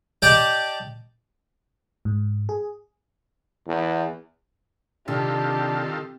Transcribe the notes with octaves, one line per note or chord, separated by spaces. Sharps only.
G4 D5 D#5 G5 A5
G#2
G#4
E2
C3 D#3 D4 F4 G4 A4